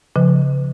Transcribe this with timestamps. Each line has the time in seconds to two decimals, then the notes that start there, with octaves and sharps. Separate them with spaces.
0.16 C#3 F3